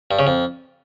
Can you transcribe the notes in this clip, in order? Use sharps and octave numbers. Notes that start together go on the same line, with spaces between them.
G2
C#3
F2